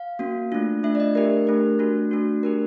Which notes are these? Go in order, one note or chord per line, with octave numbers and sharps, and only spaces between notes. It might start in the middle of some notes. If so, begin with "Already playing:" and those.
Already playing: F5
A#3 C#4 F#4
A3 D4 F4
A3 D4 F4 E5
D5
D#5
A3 D4 G4 A#4
A3 D4 G4
A3 D4 F#4
A3 D4 F#4
A3 D4 G4 A#4